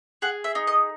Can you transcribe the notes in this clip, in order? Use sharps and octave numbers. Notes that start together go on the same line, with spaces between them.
G#4 F#5
E5
D#4
D#5